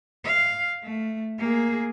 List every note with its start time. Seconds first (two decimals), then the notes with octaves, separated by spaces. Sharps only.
0.24 F5
0.83 A3
1.38 A#3 G#4